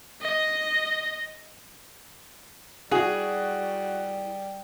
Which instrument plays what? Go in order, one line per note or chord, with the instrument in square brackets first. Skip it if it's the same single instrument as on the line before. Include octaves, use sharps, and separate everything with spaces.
[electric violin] D#5
[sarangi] G3 [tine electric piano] E4 [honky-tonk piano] F#4 [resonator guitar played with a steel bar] G#4